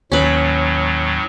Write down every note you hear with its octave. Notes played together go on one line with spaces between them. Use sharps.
D#2 A2 F#3 C#4 B4